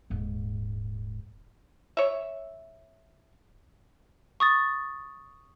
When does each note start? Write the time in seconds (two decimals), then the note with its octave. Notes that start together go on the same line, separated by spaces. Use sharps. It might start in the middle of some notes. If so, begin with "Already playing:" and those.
0.10 D#1 G#2
1.97 C#5 E5
4.40 C#6 D#6 A6